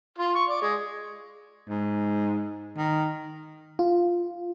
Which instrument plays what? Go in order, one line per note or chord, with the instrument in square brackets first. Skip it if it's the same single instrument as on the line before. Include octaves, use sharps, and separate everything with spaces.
[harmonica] F4 C6
C#6
D5
G#3
[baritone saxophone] G#2
D#3
[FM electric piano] F4